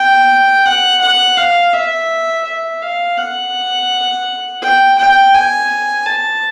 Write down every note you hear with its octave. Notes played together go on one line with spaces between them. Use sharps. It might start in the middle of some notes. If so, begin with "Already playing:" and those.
Already playing: G5
F#5
F#5
F5
E5
E5
F5
F#5
G5
G5
G#5
A5